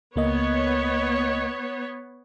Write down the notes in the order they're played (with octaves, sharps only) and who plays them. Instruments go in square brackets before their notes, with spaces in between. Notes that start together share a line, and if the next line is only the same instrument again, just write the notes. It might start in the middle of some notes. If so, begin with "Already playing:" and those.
[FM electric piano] C#2 A#3 D#5 [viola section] B3 C#5